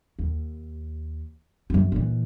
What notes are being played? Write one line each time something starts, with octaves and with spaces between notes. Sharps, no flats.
D#2
F#2 F#3
A#2 E3